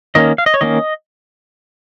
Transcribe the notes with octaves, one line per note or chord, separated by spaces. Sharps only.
D#3 A#3 C#4 D#5
F5
D#5
C#5
D#3 A#3 C#4 D#5